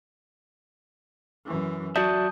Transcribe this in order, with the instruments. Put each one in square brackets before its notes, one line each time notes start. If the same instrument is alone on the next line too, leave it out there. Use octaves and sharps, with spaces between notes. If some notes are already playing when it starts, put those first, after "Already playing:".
[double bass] F#2 E3
[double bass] F#3 [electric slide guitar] F#4 D5 E5 [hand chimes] A5 D#6 G6